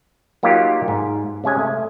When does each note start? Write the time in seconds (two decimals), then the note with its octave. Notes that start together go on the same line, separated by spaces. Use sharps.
0.43 F#3 A#3 D#4 F4 G4
0.88 G#2
1.44 C3 G#3 C#4 G#5
1.59 A3